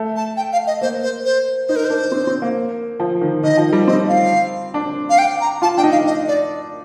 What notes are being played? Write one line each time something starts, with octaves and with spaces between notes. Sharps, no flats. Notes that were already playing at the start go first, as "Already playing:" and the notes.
Already playing: A3
A5
G5
F5
D#5
A#3 C5
C5
C5
D#4 C5
A#4
C5
D4
C4
C4
A#3
F3
D#3
D#3 D#5
F3
G3
C4 D#5
F5
D4
F5
G5
A#5
F4 A5
D4 G5
D#4
F5
D#5
D5